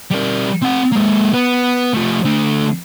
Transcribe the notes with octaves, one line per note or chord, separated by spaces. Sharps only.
G3 A#4
C4 F#5
G#3 A#3
B3
F3 A3
D3 A3